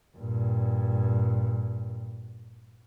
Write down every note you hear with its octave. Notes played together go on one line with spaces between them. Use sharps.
G2 A#2